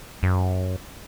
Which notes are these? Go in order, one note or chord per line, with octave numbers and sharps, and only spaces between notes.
F#2